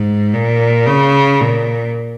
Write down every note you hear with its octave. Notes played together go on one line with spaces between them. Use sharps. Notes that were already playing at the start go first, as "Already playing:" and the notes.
Already playing: G#2
A#2
C#3
A#2